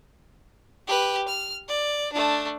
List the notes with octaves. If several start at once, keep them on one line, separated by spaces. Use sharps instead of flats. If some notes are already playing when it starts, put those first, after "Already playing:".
G4 B4
F6
D5
A3 D4